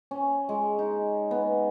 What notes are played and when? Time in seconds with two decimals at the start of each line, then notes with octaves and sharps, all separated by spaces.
0.11 C#4
0.49 G#3
0.79 D#4
1.31 B3